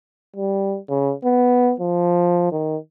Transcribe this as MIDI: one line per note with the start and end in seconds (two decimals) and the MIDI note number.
0.37 0.78 55
0.89 1.13 49
1.24 1.73 59
1.80 2.50 53
2.52 2.77 51